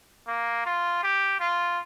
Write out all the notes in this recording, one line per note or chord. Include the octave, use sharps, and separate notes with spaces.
A#3
F4
G4
F4